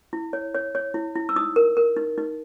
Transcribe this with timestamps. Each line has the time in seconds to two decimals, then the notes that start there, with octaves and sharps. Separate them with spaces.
0.13 E4
0.33 C#5
0.54 C#5
0.75 C#5
0.94 E4
1.15 E4
1.29 E6
1.36 D#4 D#6
1.56 A#4
1.77 A#4
1.97 D#4
2.18 D#4